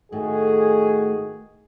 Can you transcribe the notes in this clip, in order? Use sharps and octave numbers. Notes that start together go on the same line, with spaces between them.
A2 D#3 A3 F#4 G#4